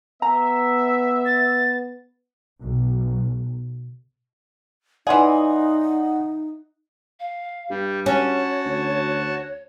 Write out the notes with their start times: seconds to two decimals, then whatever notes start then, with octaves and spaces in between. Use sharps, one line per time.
0.22 B3 E5 A#5
1.26 A6
2.60 B1
5.07 E3 D#4 G#4 C#5 D5 F#5 C6
7.20 F5
7.70 G2 G3
8.06 C#4 F#4 C#5 A5
8.65 D2